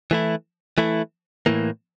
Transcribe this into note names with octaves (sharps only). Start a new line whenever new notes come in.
E3 A3 E4
E3 A3 E4
A2 E3 A#3